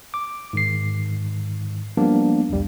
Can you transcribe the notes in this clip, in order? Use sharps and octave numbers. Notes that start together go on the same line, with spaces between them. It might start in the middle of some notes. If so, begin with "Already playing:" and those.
D6
G#2 D#3 C7
F3 G3 A#3 B3 D4
G1 C2 F2 G3